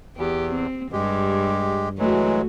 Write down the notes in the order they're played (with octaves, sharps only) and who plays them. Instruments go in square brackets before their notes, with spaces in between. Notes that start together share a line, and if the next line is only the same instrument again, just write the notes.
[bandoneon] E2 [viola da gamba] G4
[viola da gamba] C4
[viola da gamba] G2 [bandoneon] G#3 G4
[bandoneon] E3 F#3 G#3 [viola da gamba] A3 F#4